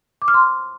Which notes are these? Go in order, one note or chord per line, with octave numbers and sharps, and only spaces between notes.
D6
F6
C6